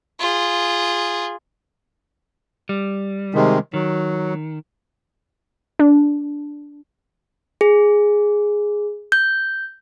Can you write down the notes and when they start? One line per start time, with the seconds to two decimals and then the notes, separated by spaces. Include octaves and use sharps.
0.19 F4 G#4
2.69 G3
3.35 C3 D#3 G#3
3.74 D#3 F#3
5.79 D4
7.61 G#4
9.12 G6